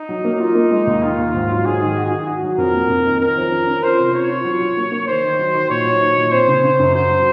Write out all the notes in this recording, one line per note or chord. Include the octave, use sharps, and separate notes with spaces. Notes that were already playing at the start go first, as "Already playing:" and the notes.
Already playing: D#4
F#3
A#3
D#4 F4
A#3
G#3
D#2
D#3 F4
D#2
G#2
F#3
G#2 G#4
D#3
F#4
F#4
F#4
F#3
F2 A#4
A#3
F2
D#3
C#4 A#4
F3
C#4
C#4
F4 C5
C3
F4 C#5
F4
F#3
F#3
A#3
A#3
D#3 C5
D#3
F#3
D#3
A#2 C#5
F#3
D#4
A#2
C4 C5
C#3
C#3
F#2
F#4 C5
F#3